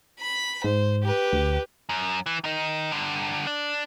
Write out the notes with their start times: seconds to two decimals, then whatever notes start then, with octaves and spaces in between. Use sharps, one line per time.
0.21 B5 B6
0.64 G#2 C5
1.03 G4 B4
1.33 D2
1.89 F#2
2.26 E3
2.44 D#3 D#4
2.91 G2 D3
3.47 D4